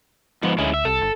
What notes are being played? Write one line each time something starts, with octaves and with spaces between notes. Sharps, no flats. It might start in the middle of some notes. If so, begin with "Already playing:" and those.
G#2 F3 B3
D2 G#3 C#4 E4
E5
C2 A4
G1